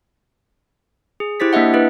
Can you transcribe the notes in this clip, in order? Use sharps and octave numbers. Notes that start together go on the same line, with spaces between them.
G#4
E4 G4 C5 A6 B6
A#3 D4 D#5 E5 F#5
D4 E4 B4